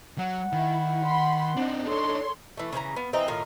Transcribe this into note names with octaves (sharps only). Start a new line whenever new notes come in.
F#3 F#5
D#3 E4
B5 C6
C4 D4 D#4
A4 C#5 C6
E3 A3
C#3 E3 B4 A#5
B3 F5
E3 C4 D#4
A2 D#3 F4 A#4